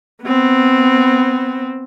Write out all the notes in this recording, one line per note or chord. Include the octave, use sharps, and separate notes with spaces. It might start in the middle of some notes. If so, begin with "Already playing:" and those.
B3 C4